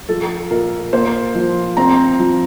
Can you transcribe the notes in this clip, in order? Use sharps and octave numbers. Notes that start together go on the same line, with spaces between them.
F3 A4
A#2 A#4
A#3 C5
F3
C4 A#5
F3